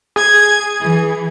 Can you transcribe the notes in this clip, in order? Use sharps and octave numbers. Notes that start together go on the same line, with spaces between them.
G#4 G#6
E3